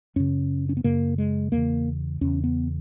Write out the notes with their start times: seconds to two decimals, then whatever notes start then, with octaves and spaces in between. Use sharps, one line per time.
0.16 F#2 C#3 C#4
0.69 C#4
0.77 B3
0.84 F#2 C#3 A#3
1.18 G#3
1.52 E2 C#3 A#3
2.21 E2 C#3 C#4
2.44 B3